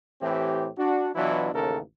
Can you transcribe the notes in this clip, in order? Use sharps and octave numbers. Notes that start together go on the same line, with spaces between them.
A2 E3 C4 G4
D4 F#4
B2 E3 F#3 D4 E4 F4
A1 D#2 C#3 A4 A#4